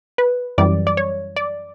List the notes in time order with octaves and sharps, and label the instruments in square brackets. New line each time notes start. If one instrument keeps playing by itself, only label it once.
[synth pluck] B4
F#2 E3 G3 D5
D5
C#5
D5